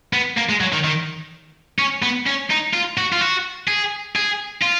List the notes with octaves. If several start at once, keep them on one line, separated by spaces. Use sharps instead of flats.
B3
A#3
G#3
F#3
D#3
D#3
C#4
B3
C#4
D#4
F4
F#4
F4
F#4
G#4
G#4
F4